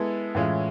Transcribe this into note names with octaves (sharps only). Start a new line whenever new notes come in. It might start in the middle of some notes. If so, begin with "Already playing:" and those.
Already playing: G#3 B3 E4 A4
A2 E3 G#3 C#4 F4